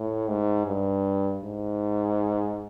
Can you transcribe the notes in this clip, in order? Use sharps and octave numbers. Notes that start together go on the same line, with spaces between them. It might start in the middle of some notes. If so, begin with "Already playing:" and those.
Already playing: A2
G#2
G2
G#2